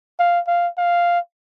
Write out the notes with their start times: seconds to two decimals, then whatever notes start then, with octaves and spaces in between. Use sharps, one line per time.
0.19 F5
0.47 F5
0.78 F5